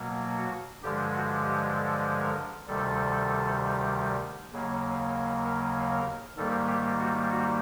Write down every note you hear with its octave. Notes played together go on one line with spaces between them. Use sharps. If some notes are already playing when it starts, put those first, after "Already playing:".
Already playing: B2 F#3 A#3
F#4
G2 D3 F3 G#3 G4
F#4
G4
A4
A#4
D2 C3 D#3 G3 A4
D#2 C#3 F#3 A#3
A#4
A#4
G#2 D#3 G3 A#3 A4
G4
F#4
F#4